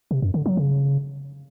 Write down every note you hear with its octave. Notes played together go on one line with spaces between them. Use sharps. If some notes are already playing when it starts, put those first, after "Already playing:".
C3
F#2
D3
F#3
C#3